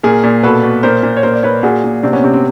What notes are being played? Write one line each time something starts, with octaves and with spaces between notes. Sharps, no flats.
A#2 G#4 A#4
A#2
B2 A4 B4
B2
A#2 A#4 C5
A#2
C#5
A#2 A#4 C5
D5
A#2 B4 C#5
A#2 F#4 G#4
A#2
C3 C4 D4
B3 C#4
C3 C4
C4